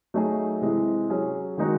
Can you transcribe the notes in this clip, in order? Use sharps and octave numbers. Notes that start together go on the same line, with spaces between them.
F#3 A3 D#4 G#4
C3 E3 G#3
F#3 C#4 G#4
D#3 G#3 D#4 F#4